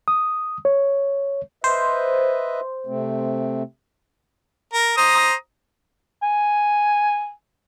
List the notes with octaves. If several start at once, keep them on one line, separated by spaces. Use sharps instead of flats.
D#6
C#5
B4 C5 D#5 E5
C3 A3 C4
A#4
C5 A#5 D#6
G#5